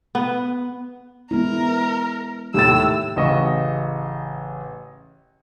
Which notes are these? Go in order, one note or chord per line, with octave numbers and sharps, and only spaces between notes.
B3
G#3 B3 E4 A#4
D#2 A2 G4 E6 A6
A1 C#3 D#5 F#5 C#6